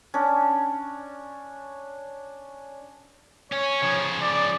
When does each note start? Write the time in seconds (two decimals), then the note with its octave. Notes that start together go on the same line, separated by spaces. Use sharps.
0.14 C#4 D4
3.52 C#4 C#5
3.82 C#3 F3
4.21 D5